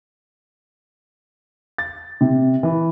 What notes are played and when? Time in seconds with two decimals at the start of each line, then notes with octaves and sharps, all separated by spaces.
1.78 A6
2.21 C3
2.63 E3